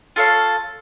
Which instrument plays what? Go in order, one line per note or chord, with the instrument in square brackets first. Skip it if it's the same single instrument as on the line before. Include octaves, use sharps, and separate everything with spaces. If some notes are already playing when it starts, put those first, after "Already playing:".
[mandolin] F4 A4 C#5 F5